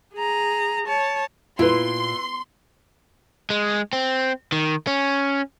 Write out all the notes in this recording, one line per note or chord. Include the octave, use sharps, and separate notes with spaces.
G#4 A#5
C#5 A5
A#2 E4 B4 C6
G#3
C4
D#3
C#4